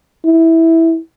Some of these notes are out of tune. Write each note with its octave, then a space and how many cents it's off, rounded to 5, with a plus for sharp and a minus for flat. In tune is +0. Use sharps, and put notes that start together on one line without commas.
E4 -10